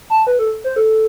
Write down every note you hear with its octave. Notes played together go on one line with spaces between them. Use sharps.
A5
B4
A4
C5
A4